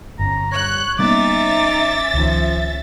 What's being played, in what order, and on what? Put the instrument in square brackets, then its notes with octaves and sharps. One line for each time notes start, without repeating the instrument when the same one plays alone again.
[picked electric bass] G1 [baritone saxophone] C#4 [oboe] A#5
[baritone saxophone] G3 [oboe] C#5 [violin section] F#6
[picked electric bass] G3 A#3 B3 [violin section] C#4 E5 A6 [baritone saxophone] D#4 [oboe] D6
[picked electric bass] C#2 D#3 [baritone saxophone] F3